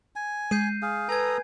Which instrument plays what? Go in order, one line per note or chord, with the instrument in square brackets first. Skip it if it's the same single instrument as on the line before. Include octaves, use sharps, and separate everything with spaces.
[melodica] G#5
[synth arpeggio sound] G#3 [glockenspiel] G6 C7 D#7
[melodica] G#4 F5
[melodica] A4 A#5 D#6 [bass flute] B4 [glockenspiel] G#5 G#6